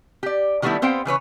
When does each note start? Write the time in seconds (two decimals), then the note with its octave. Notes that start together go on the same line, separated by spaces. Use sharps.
0.23 G4 D5
0.62 D#3 G3 A3 B3 D4 E4
0.82 B3 C4 C5 F5 G5
1.05 C#3 E3 B4 C#5